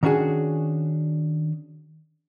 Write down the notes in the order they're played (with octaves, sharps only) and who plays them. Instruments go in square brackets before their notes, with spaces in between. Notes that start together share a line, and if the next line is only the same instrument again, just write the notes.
[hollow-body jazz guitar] D#3 C#4 D4 F#4 G#4